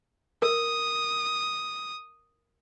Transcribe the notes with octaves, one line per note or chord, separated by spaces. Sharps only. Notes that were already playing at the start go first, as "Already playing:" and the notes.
A#4 D#6